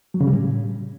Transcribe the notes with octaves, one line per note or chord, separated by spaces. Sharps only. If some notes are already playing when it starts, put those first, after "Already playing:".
F#3
C#3
G3
A2